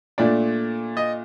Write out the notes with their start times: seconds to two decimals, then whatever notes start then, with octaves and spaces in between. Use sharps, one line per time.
0.18 A#2 A3 D4 D5
0.97 D#5